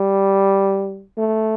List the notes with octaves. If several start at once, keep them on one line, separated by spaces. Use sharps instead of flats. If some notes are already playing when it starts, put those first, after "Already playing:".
Already playing: G3
A3